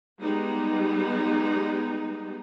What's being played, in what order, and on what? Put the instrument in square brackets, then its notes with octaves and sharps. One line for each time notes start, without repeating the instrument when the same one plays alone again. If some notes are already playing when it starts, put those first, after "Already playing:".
[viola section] G3 G#3 B3 D#4